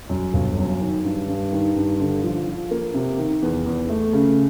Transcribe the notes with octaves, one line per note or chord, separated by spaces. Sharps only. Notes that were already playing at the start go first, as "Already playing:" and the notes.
F#2
G1
F#2
D#3
G2
G2
D#3
G2
D3
F3
F3
A#3
C3
D#3
E2
E2
A3
C#3